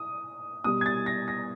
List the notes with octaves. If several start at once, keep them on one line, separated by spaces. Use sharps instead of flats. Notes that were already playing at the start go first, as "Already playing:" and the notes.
Already playing: D#6
B2 G3 D#6
G#6
A6
A#6
A#6